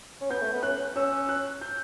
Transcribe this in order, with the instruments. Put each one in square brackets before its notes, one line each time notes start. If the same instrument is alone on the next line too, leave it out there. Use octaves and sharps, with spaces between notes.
[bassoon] C#4
[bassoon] B3 [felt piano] G6
[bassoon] A3
B3
[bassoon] C#4 [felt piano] F#6
[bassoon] C#4 [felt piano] E6
[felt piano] F#6
G6